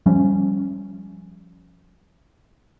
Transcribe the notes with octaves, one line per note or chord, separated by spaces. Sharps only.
F3 G3 C#4